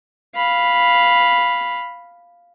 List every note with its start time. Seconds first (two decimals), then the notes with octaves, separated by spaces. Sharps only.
0.35 F5 B5